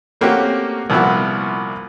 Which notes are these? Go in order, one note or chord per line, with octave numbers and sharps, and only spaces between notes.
A3 A#3 C4 C#4 F#4 G4
C2 A#2 F3 B3 E4 F#4